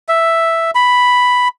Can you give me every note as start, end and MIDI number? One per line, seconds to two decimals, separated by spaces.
0.09 0.71 76
0.75 1.48 83